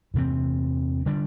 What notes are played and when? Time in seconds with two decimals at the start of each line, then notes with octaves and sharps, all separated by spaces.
0.14 E2 C3 E3 C4
1.06 D3 G3 D4